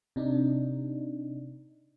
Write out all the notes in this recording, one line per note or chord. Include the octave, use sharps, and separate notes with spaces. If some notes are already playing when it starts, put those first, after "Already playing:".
C3 D4 D#4